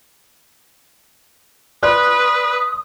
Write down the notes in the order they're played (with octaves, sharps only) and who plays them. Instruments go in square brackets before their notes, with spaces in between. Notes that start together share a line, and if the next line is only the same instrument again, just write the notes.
[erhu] B4 [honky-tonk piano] D5 C6 F#6 [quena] D#6